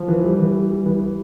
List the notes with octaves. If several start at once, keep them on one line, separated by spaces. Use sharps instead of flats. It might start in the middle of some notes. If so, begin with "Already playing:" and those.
Already playing: F3
E3
G3
E3
G3
G3
E3
E3